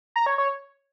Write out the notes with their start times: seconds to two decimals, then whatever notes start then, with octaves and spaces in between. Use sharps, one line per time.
0.16 A#5
0.26 C#5
0.38 C#5